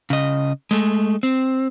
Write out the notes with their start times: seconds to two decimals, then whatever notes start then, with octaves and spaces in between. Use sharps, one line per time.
0.10 C#3 D#5
0.71 G#3 A3
1.23 C4